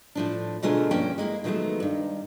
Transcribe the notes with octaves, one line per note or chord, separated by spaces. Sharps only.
A2 F3 D4
B2 D3 A3 F4 G#4 A#4
G2 F3 A#3 C#4 G5
G#3 A#3 E4
D#3 F3 F#3 G#3 A3 B3
G2 D#3